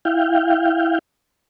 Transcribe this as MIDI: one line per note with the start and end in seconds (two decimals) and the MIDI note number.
0.05 0.99 64
0.05 0.99 77
0.05 0.99 79